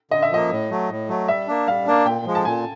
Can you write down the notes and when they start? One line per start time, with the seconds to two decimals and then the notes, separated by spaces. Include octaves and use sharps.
0.11 D3 D#5
0.22 E5
0.31 F3 A#3 D#5
0.51 A2
0.70 F#3 A3
0.90 A2
1.09 F#3 A3
1.28 G3 E5
1.48 A#3 D4
1.67 G3 F5
1.87 A#3 D4
2.06 A#2 G5
2.26 F3 G#3
2.35 A5
2.45 A#2 G#5